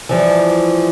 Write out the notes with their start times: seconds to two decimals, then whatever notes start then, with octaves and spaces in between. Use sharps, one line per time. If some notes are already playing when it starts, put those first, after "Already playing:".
0.09 E3 F3 G3